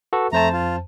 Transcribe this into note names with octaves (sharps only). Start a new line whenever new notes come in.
F#4 A4 B4
F2 A3 C5 A5 A#5
F4